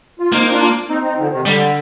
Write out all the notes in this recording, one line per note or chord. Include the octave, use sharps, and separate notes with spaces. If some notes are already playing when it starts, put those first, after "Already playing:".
F4
A#3 C4 D#4
D#4
D4 F4
C4 D#4
C4 D#4
D3 F3
C3 D#3
D3 G3